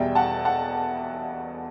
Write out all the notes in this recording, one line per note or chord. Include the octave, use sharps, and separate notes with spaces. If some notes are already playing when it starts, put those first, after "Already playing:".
Already playing: E2 B2 G3 E5 G5
F#5 A5
F#5 A5